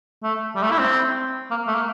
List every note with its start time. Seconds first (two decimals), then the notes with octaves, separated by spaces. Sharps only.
0.23 A3
0.56 G3
0.63 A3
0.71 E4
0.79 C4
1.51 A#3
1.67 A3
1.75 A#3